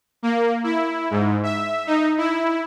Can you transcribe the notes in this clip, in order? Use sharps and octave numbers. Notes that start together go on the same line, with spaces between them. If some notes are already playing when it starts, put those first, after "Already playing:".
A#3
E4
G#2
E5
D#4
E4